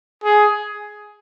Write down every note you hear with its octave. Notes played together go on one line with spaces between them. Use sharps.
G#4